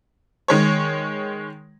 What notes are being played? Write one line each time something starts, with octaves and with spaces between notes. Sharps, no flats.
D#3 G#3 C#5